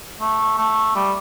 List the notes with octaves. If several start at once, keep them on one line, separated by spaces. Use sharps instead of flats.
A3
A3
G3